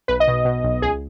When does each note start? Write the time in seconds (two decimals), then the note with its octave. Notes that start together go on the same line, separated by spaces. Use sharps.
0.08 B1 B4
0.20 D#5
0.28 B2
0.45 B2
0.64 B1
0.82 C#2 G#4